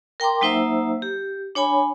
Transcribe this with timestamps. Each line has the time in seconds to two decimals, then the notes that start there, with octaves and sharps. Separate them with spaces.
0.20 A#4 G5 A#5 C6 D6
0.41 F#3 A#3 D#4 C5 E5 E6
1.02 G4
1.55 D4 C#5 G#5 B5